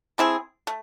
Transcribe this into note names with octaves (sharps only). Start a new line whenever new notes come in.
A3 C4 E4 G#4
A3